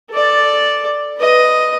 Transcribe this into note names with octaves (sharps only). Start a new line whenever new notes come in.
A4 D5
B4 D#5